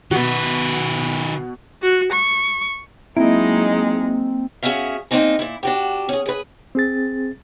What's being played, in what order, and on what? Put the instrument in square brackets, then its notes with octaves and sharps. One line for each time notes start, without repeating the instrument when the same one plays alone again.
[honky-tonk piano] B2 F#4 [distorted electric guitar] D#3 B4
[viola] F#4
C#6
[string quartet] F#3 G#3 D#4 [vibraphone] A#3 [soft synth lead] C4 [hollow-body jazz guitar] E4
[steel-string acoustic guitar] C#4 F#4 G#4 E5 F5
A#3 C4 D4 D#4 G#5
A#2 E4
D4 F#4 G4
C#4 G#4
G#4 B4
[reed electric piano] C4 G#4 A6